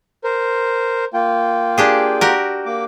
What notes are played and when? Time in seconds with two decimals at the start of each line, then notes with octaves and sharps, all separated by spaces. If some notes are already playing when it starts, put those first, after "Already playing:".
0.24 A#4 C5
1.14 A#3 F4 G5
1.78 D4 G4 G#4
2.21 F#4 G4 A#4
2.66 A#3 D6